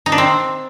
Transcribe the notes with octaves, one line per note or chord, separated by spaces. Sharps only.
D#4
D4
C4